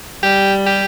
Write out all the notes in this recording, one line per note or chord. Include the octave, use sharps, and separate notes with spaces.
G3 G4
G4